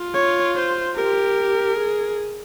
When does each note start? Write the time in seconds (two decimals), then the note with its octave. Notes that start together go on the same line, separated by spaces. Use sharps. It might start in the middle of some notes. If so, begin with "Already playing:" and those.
Already playing: F4
0.14 C#5
0.56 C5
0.96 G4 A#4
1.78 G#4